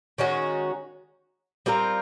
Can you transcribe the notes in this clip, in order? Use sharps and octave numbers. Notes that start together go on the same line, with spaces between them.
D#3 G#3 C#4 F#4
G3 C4 F4 A#4